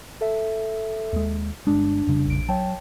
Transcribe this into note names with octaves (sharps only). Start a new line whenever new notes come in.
A4 E5
D#2 G#3
G1 G#3 D4
F1 C#3 G3
A#1 D7
F#3 C#5 G5 A5